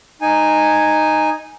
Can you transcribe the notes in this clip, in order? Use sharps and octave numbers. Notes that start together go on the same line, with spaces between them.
D#4 G#5